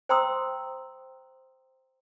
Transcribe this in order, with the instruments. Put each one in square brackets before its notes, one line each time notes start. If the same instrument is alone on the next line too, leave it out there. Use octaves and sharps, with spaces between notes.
[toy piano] C5 G5 A#5 C6 D#6 E6